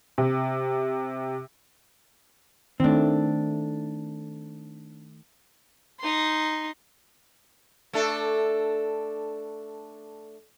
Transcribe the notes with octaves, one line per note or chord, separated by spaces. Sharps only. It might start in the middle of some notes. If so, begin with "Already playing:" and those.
C3
D#3 A3 C4 D4
D#4 C6
A3 D4 A4